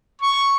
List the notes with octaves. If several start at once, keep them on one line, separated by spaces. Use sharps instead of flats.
C#6